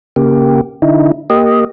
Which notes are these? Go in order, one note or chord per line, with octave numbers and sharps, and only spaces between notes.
C#3 A#3 G4
D3 D#4 E4
A#3 G4 D#5